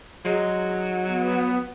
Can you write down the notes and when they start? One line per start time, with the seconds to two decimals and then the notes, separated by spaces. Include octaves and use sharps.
0.25 F#3 G#3 D#4 D#5
1.07 B3